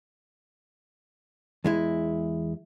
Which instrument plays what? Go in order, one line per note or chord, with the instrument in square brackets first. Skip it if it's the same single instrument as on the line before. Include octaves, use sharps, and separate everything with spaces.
[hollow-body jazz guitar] E2 G#3 E4